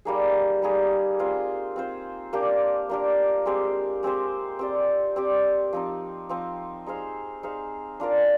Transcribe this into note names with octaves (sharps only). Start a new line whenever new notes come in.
G3 A#3 D#4 G#4
G3 A#3 D#4 G#4
C4 F4 C5
C4 F4 C5
A#3 D4 G4 A#4
A#3 D4 G4 A#4
G#3 C4 G4 C5
G#3 C4 G4 C5
C4 G4 D5
C4 G4 D5
F3 C4 D#4
F3 C4 D#4
D#4 G#4 C5 F5
D#4 G#4 C5 F5
D4 F4 A#4 D5